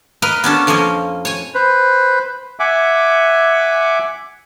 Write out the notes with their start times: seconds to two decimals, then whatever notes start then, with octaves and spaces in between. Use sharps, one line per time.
0.22 A#4 B4 D#5 F5
0.44 B3 C#4 D4 A4
0.67 F2 F3 A#3 C#5 D#5
1.25 C#5 G#5
1.54 B4 C5
2.60 E5 F#5 G#5 D6